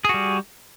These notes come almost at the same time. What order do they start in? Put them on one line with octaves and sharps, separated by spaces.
G#4 F#4 G3